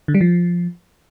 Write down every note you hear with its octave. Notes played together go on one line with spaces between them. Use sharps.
D3
G3
F3